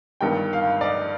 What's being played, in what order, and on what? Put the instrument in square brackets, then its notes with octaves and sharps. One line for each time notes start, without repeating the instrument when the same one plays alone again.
[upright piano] G1 G2 D#3 G5
F5
D5
D#5